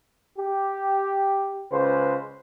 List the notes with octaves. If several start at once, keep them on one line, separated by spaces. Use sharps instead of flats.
G4
C#2 C#3 B4 C5